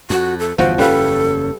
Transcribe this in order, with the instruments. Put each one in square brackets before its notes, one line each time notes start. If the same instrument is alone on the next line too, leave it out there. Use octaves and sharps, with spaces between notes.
[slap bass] F2 [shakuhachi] F#4
[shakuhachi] A4
[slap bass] G1 E2 C#3 [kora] F3 F#4 [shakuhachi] C5
[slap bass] F#1 E2 C#4 [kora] G3 B4 F5 [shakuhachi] A4